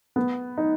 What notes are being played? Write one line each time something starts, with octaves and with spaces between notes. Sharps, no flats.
B3
D#4